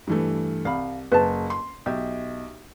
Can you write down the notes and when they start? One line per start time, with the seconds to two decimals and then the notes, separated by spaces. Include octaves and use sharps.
0.07 G2 E3 A3
0.65 C2 F5 B5
1.12 F#1 B4 A5
1.50 C6
1.86 B1 G4 E5